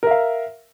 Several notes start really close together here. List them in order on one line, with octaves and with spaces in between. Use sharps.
A#4 E5 F5